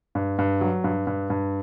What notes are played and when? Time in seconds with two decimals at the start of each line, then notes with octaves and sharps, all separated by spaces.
0.15 G2
0.39 G2
0.61 F#3
0.84 G2
1.07 G2
1.30 G2